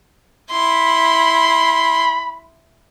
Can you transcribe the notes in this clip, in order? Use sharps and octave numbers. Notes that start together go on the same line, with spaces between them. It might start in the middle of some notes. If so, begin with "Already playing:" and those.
E4 B5 C6